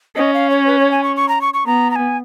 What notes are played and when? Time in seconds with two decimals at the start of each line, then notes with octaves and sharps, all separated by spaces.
0.16 C#4 D#5
0.34 F5
0.50 C#5
0.67 B4
0.79 C#5
0.91 G#5
1.04 C#6
1.16 C#6
1.29 A#5
1.41 C#6
1.54 C#6
1.66 B3 A#5
1.91 A#5
1.96 G#5